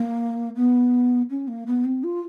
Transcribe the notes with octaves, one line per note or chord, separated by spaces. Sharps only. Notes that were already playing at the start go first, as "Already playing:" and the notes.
Already playing: A#3
B3
C#4
A#3
B3
C4
F4